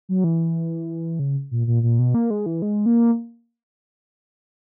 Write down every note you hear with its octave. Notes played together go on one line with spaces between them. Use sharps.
F#3
E3
C#3
A#2
A#2
A#2
B2
A#3
G#3
E3
G#3
A#3